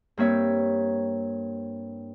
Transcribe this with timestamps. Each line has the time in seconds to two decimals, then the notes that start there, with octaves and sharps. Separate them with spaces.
0.17 G2 A#3 C4 C#5 E5